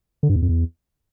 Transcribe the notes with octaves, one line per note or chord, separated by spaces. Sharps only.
D3
G2
E2
F2
E2